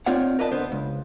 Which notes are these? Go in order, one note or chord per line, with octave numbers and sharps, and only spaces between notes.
C4 D#4 F4 C#5 D5 F#5
A#4 B4 D5 D#5 F5 A5
D3 B3 C5
C#2